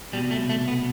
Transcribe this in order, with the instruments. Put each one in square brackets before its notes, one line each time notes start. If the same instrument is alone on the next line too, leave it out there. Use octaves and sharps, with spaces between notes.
[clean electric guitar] C2 B2 G3
A3
A3
B3